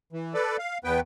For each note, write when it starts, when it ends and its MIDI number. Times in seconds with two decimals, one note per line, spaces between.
0.13 0.34 52
0.34 0.57 69
0.34 0.57 71
0.34 0.57 74
0.59 0.78 77
0.84 1.00 40
0.84 1.00 59
0.84 1.00 71
0.84 1.00 79